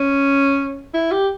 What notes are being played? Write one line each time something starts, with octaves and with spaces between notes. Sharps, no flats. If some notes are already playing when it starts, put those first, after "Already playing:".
Already playing: C#4
E4
G4